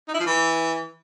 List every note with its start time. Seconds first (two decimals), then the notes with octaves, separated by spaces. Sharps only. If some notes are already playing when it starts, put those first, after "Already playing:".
0.08 D#4
0.14 E4
0.20 F3
0.26 E3